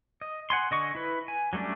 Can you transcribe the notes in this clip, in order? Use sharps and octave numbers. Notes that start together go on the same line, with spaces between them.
D#5
F#5 G#5 C6
D3 D#5 C#6
E4 B4
G#5
F#3 G3 A3 C#4 D4